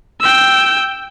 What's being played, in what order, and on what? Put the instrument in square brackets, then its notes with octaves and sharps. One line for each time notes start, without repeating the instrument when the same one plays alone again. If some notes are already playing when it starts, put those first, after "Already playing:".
[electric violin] G5 E6